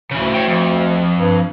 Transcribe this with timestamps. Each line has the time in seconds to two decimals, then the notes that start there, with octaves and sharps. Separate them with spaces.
0.11 D2 C#3 E3
0.34 C#5 G5
0.47 F2
1.17 G2